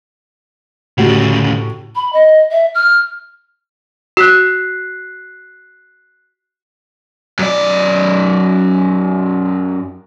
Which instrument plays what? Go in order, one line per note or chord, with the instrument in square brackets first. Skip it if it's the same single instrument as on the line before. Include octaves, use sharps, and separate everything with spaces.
[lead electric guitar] D2 C#3 [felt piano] A2 F#4 G4
[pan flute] B5
D#5
E5
F6
[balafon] F#4 [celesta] F#6 B6 C7
[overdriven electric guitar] F#2 D5